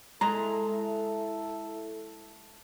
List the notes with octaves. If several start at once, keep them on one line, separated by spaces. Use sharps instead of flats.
G#3 E4 A4 A#5